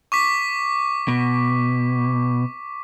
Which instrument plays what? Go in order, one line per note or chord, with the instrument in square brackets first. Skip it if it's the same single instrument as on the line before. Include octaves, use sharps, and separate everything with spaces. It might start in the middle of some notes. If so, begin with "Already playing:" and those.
[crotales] C#6 D6 B6
[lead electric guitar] B2